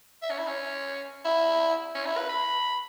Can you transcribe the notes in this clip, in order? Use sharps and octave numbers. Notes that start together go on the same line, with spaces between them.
E5
C#4
E4
C#4
E4
C#4
E4
B4
B5